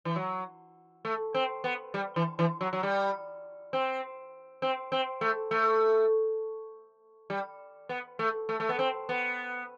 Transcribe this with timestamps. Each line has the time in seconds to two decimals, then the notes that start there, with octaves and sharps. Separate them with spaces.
0.05 E3
0.16 F#3
1.05 A3
1.34 C4
1.64 B3
1.94 G3
2.16 E3
2.39 E3
2.61 F#3
2.73 F#3
2.83 G3
3.73 C4
4.62 C4
4.92 C4
5.21 A3
5.51 A3
7.30 G3
7.89 B3
8.19 A3
8.49 A3
8.60 A3
8.69 B3
8.79 C4
9.09 B3